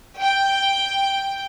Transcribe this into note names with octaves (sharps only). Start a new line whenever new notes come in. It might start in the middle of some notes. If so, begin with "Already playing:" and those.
G5